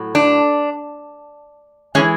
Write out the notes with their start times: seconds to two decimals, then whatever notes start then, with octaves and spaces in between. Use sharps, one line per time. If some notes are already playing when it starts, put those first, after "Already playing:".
Already playing: A2 F#3
0.15 D4
1.95 E3 G#3 C#4